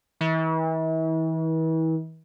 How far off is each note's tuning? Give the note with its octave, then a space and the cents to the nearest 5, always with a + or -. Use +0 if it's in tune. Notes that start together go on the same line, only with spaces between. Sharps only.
E3 -40